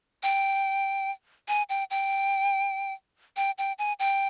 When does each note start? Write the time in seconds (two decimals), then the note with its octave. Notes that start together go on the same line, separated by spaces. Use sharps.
0.23 G5
1.48 G#5
1.69 G5
1.91 G5
3.37 G5
3.58 G5
3.78 G#5
3.99 G5